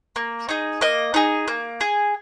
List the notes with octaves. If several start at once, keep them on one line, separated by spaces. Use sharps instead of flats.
A#3
D#4 G#4
A#3 D#5
D#4 G#4
A#3
G#4